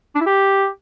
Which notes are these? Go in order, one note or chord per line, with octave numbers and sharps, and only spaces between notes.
D4
E4
G4